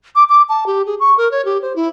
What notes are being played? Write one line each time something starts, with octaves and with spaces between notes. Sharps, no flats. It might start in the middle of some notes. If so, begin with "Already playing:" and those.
D6
D6
A5
G4
G#4
C#6
A#4
C#5
G4
C5
E4